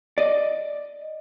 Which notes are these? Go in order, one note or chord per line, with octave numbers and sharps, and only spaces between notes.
D5 D#5